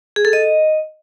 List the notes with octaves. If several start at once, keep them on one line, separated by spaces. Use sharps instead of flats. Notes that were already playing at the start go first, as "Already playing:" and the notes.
G#4
A4
D#5